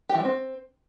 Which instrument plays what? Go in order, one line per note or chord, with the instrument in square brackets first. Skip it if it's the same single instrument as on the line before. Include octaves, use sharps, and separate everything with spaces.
[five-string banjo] G4
E3
G3
C4